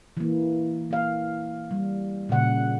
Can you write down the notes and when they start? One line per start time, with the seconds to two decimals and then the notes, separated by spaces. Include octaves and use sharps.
0.17 E3 A#3
0.91 A#3 F5
1.71 G3
2.29 A#2 C#3 F#5